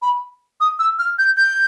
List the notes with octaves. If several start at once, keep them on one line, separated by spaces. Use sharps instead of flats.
B5
D#6
E6
F6
G6
G6